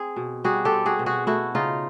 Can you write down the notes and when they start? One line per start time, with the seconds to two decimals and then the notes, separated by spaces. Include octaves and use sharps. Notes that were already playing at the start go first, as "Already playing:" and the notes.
Already playing: C4 G#4
0.16 B2
0.44 G3 F#4 G#4
0.65 G4 A4
0.72 C4
0.86 F#4 G#4
0.99 B2
1.06 F#4 G#4
1.27 A3 E4 F#4
1.55 C#3 D#4 F4